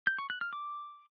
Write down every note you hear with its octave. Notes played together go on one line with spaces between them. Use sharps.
G6
C#6
F#6
F6
D6